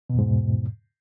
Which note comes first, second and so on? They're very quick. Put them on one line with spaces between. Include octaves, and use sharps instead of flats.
B2 E2 G#2